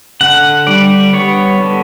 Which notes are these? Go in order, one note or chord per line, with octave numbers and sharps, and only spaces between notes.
D3 F#5
G3 D5
B3 C#5
D3